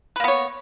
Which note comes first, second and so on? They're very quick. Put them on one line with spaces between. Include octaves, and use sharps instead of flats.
B4 A#3 B3 C#5